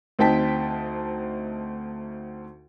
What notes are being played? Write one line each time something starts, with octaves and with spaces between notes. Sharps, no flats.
D2 C4 D#4 G5 A5 B6